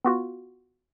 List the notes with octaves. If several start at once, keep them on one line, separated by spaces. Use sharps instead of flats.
B3 F4 F#4